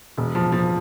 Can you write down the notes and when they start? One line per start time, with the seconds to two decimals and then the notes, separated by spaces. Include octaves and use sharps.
0.18 E1
0.35 F3
0.52 F3